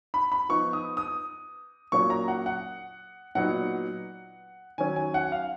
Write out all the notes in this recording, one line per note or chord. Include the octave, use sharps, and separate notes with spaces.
B5
B5
F3 B3 D#4 C#6
D#6
D#6
A#2 F#3 A#3 C#4 C#6
A#5
F#5
F#5
A#2 F#3 B3 D#4 F#5
D#3 F#3 C#4 G#5
G#5
F#5
F5